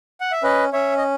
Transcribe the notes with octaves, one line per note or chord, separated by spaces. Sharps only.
F#5
E5
C#4 B4 D#5
C#4 C#5 E5
D#5